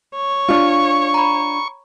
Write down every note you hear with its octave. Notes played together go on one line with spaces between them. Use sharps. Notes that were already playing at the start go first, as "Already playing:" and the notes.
C#5
D4 F4 C#6
A#5 B5